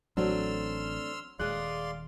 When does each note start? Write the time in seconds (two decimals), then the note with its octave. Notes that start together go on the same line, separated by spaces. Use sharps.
0.17 A1 F#3 A3 C4 D4 C6 E6 F6
1.39 D#1 G#3 G#4 D5 F5 C6 F#6